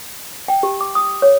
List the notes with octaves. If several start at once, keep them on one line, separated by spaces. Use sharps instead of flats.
G5
G4
D6
D#6
C#5